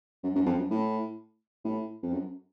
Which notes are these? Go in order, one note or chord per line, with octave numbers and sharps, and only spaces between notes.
F#2
F#2
F2
F#2
A2
A2
F2
F#2